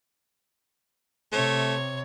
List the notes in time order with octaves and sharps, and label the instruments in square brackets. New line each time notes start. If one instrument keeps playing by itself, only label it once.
[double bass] C3 [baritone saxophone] A3 [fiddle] C#5